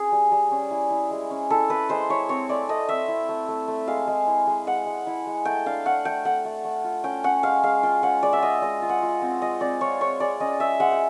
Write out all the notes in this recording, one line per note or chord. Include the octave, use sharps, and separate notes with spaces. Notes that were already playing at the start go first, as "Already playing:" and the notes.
Already playing: C#4 G#4
G3
G3
C#4
E4
E4
G#3
C#4
E4 A4
E4 B4
G#3 C5
E4 C#5
C4 C#5
A3 D5
A3 D#5
C4 E5
E4
A3
A3
A3
G#3 F5
G#3
E4
G#3
G#3 F#5
G#3
E4
G#3
A3 G5
D4 F5
A3 F#5
A3 G5
A3 F#5
A3
A3
F4
C#4 G5
C#4 F#5
G#3 F5
G#3 F5
F4 G5
C#4 F#5
G#3 D5
E5
F4 D#5
G#3 D#5
F4
F#5
F4
C4
G#3 D#5
C4 D5
F4 C#5
G#3 C#5
G#3 D5
C#4 D#5
G#3 E5
G#3 F#5
G5